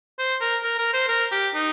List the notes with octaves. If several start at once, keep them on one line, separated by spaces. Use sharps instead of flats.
C5
A#4
A#4
A#4
C5
A#4
G4
D#4